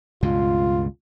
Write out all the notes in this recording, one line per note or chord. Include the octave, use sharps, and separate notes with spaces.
C#2 G2 B2 F4